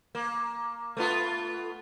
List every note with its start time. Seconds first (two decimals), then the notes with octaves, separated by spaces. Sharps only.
0.15 A#3
0.97 A3 B3 F4